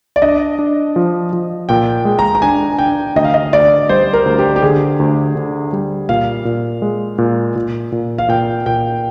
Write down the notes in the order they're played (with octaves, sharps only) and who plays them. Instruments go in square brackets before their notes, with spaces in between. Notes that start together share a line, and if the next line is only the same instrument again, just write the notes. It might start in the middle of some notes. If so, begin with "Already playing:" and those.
[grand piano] D5
[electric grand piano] D4 [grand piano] D#5
[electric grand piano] D4
F3
F3
[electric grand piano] A#2 [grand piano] G5
[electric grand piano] G#3
[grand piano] A#5
A#5
[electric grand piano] D4 [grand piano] G#5
[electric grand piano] D4 [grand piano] G5
[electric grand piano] D2 [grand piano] D#5
[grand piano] F5
D#5
[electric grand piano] D2 [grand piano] D5
[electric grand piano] G3 [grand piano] C5
[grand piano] A#4
[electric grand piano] D2
[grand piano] G4
G4
[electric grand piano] D3 [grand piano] G#4
[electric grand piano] D2
D3
G3
[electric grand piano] A#2 [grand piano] F5
[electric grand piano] A#2
G#3
A#2
A#2
A#2
[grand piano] F5
[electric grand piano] A#2 [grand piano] G5
[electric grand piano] A#2 [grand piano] G5